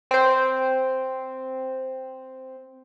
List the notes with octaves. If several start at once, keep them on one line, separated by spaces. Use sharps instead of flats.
C4 C5